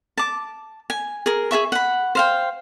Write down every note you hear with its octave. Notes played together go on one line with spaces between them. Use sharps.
A5 D6
G#5
G#4 A#4
G#4 A4 E5 C#6
F#5 B5
C5 F5 G5